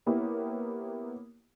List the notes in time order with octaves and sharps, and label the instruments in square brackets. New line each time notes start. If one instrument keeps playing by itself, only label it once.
[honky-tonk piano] A#3 B3 E4 G4 C#5